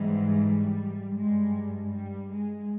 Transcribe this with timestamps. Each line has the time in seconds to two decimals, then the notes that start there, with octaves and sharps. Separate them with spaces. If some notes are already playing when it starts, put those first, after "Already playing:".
Already playing: G#2 E3 G3 G#3
0.38 G3
1.15 G2 G3 G#3
1.92 G3
2.30 G#3